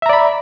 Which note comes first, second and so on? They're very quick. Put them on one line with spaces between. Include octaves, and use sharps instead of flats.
E5 A#5 D5 B5